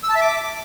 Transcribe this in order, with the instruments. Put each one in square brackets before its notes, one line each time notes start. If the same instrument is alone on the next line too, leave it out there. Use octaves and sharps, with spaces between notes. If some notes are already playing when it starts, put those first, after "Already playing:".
[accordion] E6
A5
E5
D6